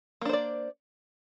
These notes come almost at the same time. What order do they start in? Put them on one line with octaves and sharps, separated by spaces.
A#3 D4 C5 D5